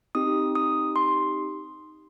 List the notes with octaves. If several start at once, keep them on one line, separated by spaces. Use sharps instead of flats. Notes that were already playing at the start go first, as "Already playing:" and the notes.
C4 D#4 G4 D#6
D#6
C6